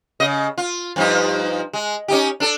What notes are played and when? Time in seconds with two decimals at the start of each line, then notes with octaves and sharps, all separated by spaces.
0.20 C#3 D#5
0.58 F4
0.96 G2 F3 D#4
1.73 G#3
2.08 C#4 D#4 G4
2.40 D4 A4